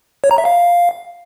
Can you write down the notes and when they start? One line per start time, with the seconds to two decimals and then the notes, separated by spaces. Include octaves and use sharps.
0.24 C#5
0.31 A#5
0.38 E5
0.45 F5